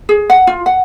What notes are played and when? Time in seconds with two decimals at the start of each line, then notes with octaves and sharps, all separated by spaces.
0.09 G#4
0.30 F#5
0.47 F4
0.66 F#5